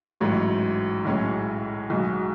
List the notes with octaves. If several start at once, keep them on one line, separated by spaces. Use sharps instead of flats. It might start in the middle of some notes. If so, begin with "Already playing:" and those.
A1 G#2 F#3 A3
B1 A2 G#3 C#4 E4
B1 B2 G#3 D#4 F#4